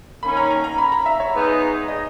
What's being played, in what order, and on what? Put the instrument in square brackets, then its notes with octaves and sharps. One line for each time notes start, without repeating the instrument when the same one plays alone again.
[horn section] D#3 A#3 C#4 [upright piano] B5
[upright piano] A#5
A#5
A#5
B5
A#5
E5
C#5
[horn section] G#3 B3 D#4 G#4
[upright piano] D#5